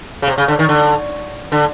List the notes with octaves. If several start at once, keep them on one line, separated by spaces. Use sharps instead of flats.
C#3
C3
C#3
D3
D#3
D3
D3